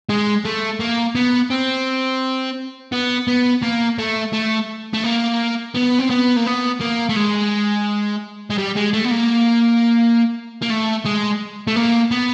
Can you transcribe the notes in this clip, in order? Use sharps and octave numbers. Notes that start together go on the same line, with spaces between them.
G#3
A3
A#3
B3
C4
B3
B3
A#3
A3
A3
A3
A#3
B3
C4
B3
A#3
B3
A#3
A3
G#3
G#3
G3
G#3
A3
B3
A#3
A#3
A3
G#3
A3
A#3
B3